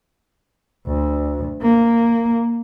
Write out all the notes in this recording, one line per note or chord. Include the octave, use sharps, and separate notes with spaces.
D2
A#3